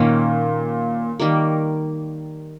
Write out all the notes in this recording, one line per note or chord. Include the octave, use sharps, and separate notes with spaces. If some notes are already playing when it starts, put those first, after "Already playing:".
Already playing: A#2 D#3 A#3 C#4
D#3 G3 A#3